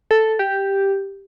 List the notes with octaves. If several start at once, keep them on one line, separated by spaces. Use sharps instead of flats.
A4
G4